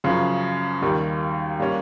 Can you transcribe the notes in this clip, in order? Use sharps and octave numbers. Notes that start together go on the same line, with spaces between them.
F#2 C#3 F3
D#2 D#3 G3
G3 A#3 C#4